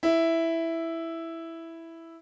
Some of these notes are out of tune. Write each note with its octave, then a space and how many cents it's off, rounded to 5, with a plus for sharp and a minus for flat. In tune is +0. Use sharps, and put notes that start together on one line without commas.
E4 +0